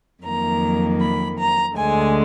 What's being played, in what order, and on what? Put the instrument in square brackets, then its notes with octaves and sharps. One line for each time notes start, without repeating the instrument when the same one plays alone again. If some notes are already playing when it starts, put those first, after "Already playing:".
[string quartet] F2 D#3 F#3 A#3 A#5
B5
A#5
D2 D3 G#3 G#5